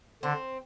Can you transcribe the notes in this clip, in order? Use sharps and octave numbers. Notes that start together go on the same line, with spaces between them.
D3 C4